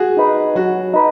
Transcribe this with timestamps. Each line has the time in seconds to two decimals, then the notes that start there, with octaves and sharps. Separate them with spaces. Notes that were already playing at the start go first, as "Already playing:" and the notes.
Already playing: F#4 G#4
0.17 D#4 B4
0.55 F#3 F#4
0.94 D#4 B4